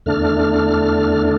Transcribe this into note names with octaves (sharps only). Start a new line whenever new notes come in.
E2 D3 A3 D4 F6